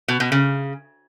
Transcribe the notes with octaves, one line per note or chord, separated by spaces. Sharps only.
B2
B2
C#3